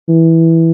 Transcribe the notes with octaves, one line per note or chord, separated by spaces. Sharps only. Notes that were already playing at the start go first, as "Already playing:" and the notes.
E3